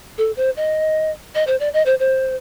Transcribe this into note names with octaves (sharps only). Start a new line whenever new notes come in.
A4
C5
D#5
D#5
C5
D5
D#5
C5
C5